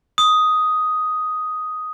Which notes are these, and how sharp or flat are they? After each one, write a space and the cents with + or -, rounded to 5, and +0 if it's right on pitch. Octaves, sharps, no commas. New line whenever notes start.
D#6 +5